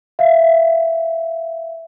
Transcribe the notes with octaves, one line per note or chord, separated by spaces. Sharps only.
E5 F5